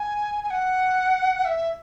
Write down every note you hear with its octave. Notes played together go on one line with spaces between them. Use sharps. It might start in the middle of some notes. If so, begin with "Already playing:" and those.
Already playing: G#5
G#5
F#5
E5